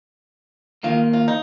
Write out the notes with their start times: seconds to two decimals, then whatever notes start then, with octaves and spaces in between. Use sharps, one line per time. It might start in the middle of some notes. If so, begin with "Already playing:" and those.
0.83 D#2 D#3 A#3 F4
1.13 F4
1.28 D#4